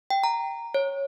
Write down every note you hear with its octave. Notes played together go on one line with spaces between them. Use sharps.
G5
A#5
C#5